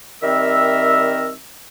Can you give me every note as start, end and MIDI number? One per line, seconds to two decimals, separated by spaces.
0.23 1.34 51
0.23 1.34 55
0.23 1.34 60
0.23 1.34 70
0.23 1.34 76
0.23 1.34 88